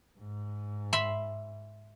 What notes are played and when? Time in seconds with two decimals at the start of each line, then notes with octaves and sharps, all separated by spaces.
0.19 G#2
0.93 E5 B5 C6